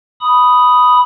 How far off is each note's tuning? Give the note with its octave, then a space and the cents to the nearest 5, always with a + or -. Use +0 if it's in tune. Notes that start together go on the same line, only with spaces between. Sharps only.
B5 +0 D#6 +0